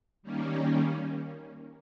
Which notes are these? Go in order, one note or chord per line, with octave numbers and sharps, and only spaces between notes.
D#3 G3 A#3 C#4